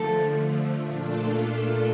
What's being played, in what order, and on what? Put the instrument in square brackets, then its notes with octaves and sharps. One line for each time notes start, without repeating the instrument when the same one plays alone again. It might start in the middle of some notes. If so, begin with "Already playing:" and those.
Already playing: [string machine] D3 F3 A3 [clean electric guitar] A4
[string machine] A#2 A3 D4 F4 A4